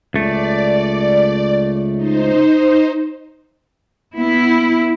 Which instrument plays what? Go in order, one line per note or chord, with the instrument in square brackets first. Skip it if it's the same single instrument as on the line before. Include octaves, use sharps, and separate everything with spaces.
[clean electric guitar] C#2 A3 [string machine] D5
[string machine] D#4 C5
[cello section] B3 E4